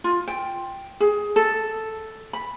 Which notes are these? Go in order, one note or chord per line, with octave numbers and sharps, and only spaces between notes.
F4
G5
G#4
A4
B5